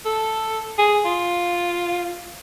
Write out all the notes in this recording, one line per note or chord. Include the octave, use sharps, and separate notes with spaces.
A4
G#4
F4